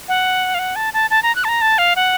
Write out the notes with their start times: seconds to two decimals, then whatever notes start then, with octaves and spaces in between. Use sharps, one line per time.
0.08 F#5
0.54 F5
0.59 F#5
0.76 A5
0.94 A5
1.10 A5
1.23 A#5
1.35 F#6
1.44 A5
1.49 A#5
1.61 A5
1.78 F5
1.96 F#5